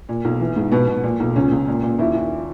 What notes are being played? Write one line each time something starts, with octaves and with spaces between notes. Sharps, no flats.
A#2
B1
E3
G#2
B2 B3
B2
A#2
B1
C#2 C#4
C#2
A#2
A#2
D#2 E4
D#2